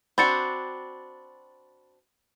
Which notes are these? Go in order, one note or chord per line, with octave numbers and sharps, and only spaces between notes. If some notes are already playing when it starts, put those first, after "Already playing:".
C4 D4 F#4 B5 A6 C#7